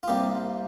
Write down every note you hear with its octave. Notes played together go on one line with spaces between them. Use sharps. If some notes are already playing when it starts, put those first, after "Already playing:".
F4
C2 C3 G3 A#3 G4